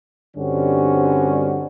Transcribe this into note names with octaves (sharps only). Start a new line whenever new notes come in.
G2 D3 G3 C4 C#4 F#4